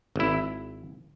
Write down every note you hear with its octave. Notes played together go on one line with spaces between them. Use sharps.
G#1 E4